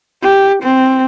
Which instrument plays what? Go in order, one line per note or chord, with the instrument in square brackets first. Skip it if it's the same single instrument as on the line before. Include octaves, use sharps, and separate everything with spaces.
[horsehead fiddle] G4
C4